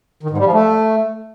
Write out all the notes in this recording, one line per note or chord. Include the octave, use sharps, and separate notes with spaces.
D#3
G#2
G3
F3
A3